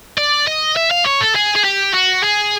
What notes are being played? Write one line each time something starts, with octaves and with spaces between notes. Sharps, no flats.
D5
D#5
E5
F5
C#5
A4
G#4
G#4
G4
F#4
G#4